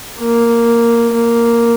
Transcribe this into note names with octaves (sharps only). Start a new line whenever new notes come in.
A#3
A#3